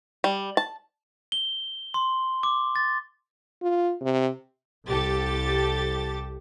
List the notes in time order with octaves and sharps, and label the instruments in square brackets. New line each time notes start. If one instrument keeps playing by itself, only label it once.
[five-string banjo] G3
A5
[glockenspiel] G7
C6
D6
A6
[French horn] F4
C3
[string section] C2 G4 A4 A6